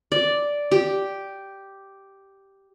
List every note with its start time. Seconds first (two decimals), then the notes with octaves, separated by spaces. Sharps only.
0.12 D5
0.71 G4